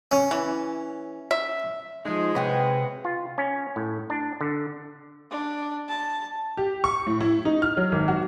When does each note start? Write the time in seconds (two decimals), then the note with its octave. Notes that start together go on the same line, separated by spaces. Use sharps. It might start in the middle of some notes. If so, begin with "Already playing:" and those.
0.12 C#4
0.31 E3
1.31 E5
2.05 F3 G#3 D#4
2.35 C3 F#4 B4 C#5 F#5 G5
3.04 F4
3.38 C#4
3.76 A2
4.10 D4
4.41 D3
5.31 D4
5.89 A5
6.57 G4
6.84 C#6
7.07 A2
7.20 E4
7.45 D#4
7.62 F6
7.77 F#3
7.92 G#1
8.08 F#4